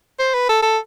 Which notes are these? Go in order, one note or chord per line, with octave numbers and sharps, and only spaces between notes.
C5
B4
A4
A4